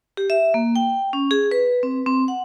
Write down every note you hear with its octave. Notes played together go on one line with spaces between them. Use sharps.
G4
E5
A#3
G5
C#4
G#4
B4
C4
C4
F#5